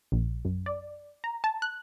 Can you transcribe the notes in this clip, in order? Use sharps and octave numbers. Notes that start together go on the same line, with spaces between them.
A#1
F#2
D5
A#5
A5
F#6